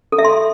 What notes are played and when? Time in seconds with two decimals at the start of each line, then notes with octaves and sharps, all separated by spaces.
0.12 A4
0.18 E5
0.25 C6